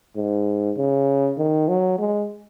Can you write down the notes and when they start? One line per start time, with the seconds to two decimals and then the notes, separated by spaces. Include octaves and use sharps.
0.16 G#2
0.77 C#3
1.38 D#3
1.68 F#3
1.99 G#3